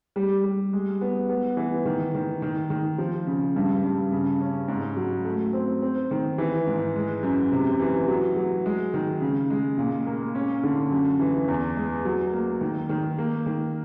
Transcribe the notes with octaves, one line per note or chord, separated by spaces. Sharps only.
G3
G3
G#3
B3
B3
E3
D#3
D#3
D#3
D#3
F3
C#3
G2
G2
C#3
C#4
G#2
F#3
A3
C4
C4
D#3
E3
G#2
G#3
F#2
C3
E3
F#3
F#3
G#3
D#3
C#3
G#3
A#2
A#3
C#4
D3
F#2
E3
E2
G#3
F#3
A#3
D#3
D#3
A#3
D#3